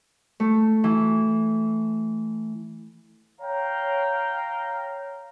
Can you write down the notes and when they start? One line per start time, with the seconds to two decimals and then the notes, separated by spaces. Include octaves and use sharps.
0.40 A3
0.84 E3
3.41 C#5 F5 G5 A#5